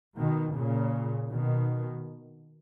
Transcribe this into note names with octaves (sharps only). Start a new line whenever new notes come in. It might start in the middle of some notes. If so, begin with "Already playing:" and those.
B2 D#3
A#2 C#3
B2 D#3